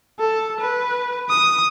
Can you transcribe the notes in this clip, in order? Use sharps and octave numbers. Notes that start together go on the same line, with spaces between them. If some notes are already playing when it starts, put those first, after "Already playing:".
A4
B4
D#6